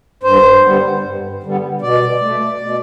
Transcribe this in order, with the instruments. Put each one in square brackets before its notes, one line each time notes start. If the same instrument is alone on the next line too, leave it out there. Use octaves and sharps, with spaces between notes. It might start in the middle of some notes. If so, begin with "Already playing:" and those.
[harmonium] G2 C5
D3 G3 B3
G2
D3 G3 B3
B2 D5
A3
B2